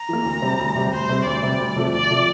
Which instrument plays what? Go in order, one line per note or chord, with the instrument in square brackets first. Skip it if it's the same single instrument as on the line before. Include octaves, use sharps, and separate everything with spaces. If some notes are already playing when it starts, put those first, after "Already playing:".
Already playing: [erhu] A#5
[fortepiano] E3 A#3
D2
C3 G3 C4
D2
C3 G3 C4
[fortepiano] D2 [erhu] C5
[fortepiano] C3 G3 C4
[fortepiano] D2 [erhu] D5
[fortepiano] C3 G3 C4
D2
C3 F3 A3
[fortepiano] D2 [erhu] D5
[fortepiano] C3 F3 A3